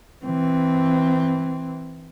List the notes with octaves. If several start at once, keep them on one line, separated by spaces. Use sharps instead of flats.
E3 C4